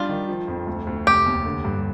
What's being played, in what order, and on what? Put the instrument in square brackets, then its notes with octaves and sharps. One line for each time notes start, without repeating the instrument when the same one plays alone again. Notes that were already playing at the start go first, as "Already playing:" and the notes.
Already playing: [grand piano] G3 D4 [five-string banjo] F4
[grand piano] D#3
F3
F2
D2
D2
[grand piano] F1 [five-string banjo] G4
[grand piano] D#2
D3
G2